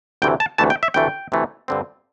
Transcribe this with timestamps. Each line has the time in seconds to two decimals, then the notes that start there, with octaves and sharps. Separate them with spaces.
0.22 D2 C3 E3 A3 G5
0.40 A5
0.58 D2 C3 E3 A3 A5
0.70 G5
0.83 E5
0.94 D2 C3 E3 A3 G5
1.32 D2 C3 E3 A3
1.68 G2 D3 C4